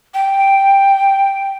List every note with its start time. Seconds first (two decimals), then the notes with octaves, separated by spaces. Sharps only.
0.14 G5